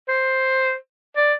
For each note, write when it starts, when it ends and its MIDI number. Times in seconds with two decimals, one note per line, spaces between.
0.09 0.74 72
1.17 1.34 74